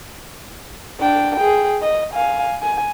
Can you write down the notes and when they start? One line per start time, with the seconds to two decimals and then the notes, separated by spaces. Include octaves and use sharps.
1.00 D4 G5
1.36 G#4 G5
1.82 D#5
2.14 F5 G#5
2.62 G#5